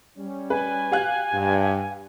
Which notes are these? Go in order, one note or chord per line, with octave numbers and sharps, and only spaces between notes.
G3 C#4
B4 G#5
G4 F5 F#6
G2